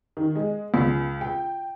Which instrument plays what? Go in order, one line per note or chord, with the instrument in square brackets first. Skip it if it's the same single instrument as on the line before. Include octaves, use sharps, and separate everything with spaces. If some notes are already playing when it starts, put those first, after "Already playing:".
[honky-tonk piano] D#3
G#3
C#2
G5